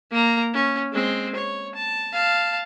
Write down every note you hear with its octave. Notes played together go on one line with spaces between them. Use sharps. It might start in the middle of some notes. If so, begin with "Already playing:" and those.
A#3 A#5
C#4
G#3 C4
C#5
A5
F5 A5